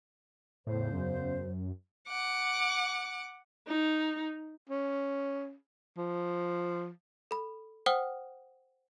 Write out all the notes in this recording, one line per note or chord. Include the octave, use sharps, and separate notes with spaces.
E2 A2 C#3 C5
F#2
F#5 D6
D#4
C#4
F3
A4 B5
C5 F#5 G5 D#6 F6